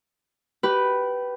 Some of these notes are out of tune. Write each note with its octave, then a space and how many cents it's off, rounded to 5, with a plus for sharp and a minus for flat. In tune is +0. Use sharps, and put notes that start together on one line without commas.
G4 -20 B4 +0